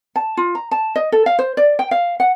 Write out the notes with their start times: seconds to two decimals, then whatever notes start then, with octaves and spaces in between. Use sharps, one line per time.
0.16 A5
0.37 F4
0.55 A#5
0.71 A5
0.96 D#5
1.12 A4
1.26 F5
1.39 C5
1.57 D5
1.79 G5
1.91 F5
2.20 F#5